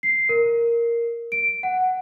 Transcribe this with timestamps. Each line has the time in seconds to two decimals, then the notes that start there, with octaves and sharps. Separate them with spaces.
0.03 C7
0.29 A#4
1.32 D7
1.63 F#5